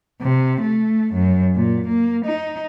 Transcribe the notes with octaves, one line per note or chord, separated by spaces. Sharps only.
C3
A3
F#2
A#2
A#3
D#4